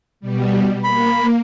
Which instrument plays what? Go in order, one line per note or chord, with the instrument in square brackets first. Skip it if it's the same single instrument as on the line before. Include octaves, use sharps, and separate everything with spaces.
[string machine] B2 G3
[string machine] A#3 [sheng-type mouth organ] B5